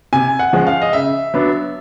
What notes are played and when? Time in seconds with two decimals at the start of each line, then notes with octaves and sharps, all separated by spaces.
0.13 C3 G#5
0.39 F#5
0.53 F3 G#3 C#4
0.67 F5
0.82 D#5
0.93 C#3 E5
1.34 F#3 B3 D4